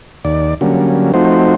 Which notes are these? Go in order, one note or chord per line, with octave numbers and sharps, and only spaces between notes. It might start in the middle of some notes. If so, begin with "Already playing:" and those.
D#2 D5
D3 F#3 G3 A#3 C#4
F3 A3 C4 D#4 F#4 C5